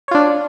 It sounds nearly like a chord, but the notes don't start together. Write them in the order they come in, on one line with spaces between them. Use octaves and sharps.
C#5 F4 D4